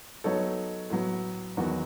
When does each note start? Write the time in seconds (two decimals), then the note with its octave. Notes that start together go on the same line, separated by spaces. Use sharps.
0.24 F#3 B3 D#4 A4 C#5
0.90 A2 F#3 B3
1.57 E2 D#3 F#3 B3 F#4